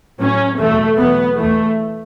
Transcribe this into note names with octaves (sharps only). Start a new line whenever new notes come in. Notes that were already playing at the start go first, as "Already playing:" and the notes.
A2 F#3 C#4
E2 B2 F#3 A3
E2 B2 F#3 B3
E2 E3 A3